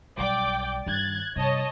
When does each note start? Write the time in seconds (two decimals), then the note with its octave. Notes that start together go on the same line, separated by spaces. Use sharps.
0.18 B1 G3 D5 G5 D6
0.86 G2 D#3 F#6 G#6 A6
1.36 G2 C3 C#5 D#5 A5